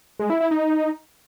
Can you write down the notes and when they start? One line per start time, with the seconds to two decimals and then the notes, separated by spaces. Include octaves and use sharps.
0.19 G#3
0.30 E4
0.40 E4
0.51 D#4